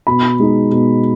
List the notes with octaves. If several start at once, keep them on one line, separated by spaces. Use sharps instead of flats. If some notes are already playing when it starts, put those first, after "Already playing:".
B2 B5
G#3 D#4
B2